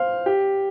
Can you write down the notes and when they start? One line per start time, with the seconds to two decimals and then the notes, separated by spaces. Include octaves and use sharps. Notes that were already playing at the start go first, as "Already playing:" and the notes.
Already playing: C5 F5
0.26 G4